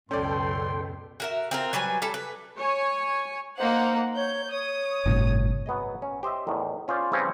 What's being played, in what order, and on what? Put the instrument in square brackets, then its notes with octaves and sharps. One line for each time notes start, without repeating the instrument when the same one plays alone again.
[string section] C#2 F#2 B2 [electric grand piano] C#4 D5 [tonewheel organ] A4 G5 [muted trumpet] C6
[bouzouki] F#4 A#4 E5
C4 F4 A#4
F#3 G3 B4 G#5
G3 A4
B4
[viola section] C#5 G#5
[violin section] A#3 D#4 F#5 [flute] C5
[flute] C#5 [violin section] G6
[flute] C#5 [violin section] D#6
[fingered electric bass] G1 A2 C3
[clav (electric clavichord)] F#3 B3 G#4 D#5
C#4
G4 C5 D#5 E5
E2 A2 D#3
C#4 F4 G#4 C5 D5
C#3 E3 F3 G3 C4 C#4